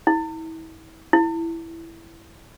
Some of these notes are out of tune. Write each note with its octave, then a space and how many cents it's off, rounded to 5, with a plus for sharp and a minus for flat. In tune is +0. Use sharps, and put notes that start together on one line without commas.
E4 -35
E4 +5